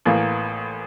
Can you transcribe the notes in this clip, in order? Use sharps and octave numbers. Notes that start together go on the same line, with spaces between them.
A1 A2 E3 A#3